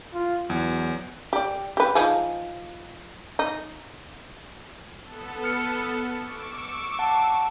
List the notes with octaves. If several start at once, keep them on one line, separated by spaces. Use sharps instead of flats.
F4
E2 F#3
G4 D5
G4 B4
F3 D#4 G#4
D#4
B3 A4
F6 C#7
C#6 D6 E6
F#5 A5